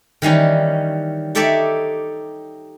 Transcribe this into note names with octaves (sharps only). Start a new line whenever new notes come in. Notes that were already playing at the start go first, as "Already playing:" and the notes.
D#3 E3 G3 C#4
D#4 G4 A4 C#5 D5 E5